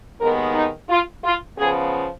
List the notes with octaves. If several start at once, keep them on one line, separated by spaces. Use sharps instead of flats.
D#2 D#3 G#3 B3 A#4
D#4
F4
F4
C#3 F3 B3 G#4